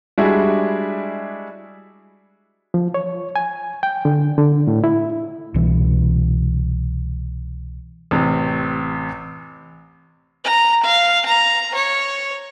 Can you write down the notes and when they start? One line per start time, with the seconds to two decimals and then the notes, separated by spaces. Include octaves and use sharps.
0.18 G3 G#3 D4 E4 F#4 G#4
2.74 F3
2.94 C#5
3.36 G#5
3.83 G5
4.05 D3
4.38 D3
4.67 A2
4.84 E4
5.54 C2 B2 E3
8.11 A1 C3
10.44 A#5
10.83 F5
11.26 A#5
11.74 C#5